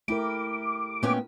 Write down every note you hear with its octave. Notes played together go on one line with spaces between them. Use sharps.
A3 E4 G4 A#4 D6
A#2 A3 B3 C#4 G5